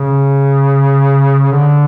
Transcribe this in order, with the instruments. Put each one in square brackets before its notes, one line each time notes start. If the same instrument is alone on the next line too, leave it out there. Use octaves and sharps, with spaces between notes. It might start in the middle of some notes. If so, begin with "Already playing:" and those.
Already playing: [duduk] C#3
D3